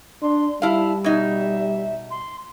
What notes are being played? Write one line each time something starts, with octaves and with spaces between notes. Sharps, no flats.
D4 C6
G3 E4 F5 A5
B2 D#4 E5
C6